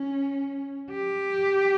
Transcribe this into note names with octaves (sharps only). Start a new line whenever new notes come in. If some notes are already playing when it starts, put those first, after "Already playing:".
Already playing: C#4
G4